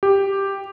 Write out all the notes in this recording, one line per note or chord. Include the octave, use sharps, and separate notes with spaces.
G4